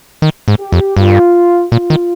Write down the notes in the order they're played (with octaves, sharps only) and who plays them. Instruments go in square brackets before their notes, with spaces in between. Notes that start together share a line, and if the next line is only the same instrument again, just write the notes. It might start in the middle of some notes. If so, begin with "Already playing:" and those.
[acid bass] D#3
G#2
[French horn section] G4
[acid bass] F2
[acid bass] G2 [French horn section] F4
[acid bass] A#2 [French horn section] F4
[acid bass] D#3